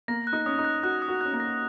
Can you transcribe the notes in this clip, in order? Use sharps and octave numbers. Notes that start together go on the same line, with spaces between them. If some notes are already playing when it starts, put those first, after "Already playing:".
A#3 A#6
F#6
D#4
C#4 D#6
D#4
F#6
F#4 F#6
D#6
F#4
C#4 F#6
A#3
A#6